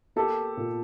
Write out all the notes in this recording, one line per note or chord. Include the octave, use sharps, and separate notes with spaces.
A#3 G4 A4
A#2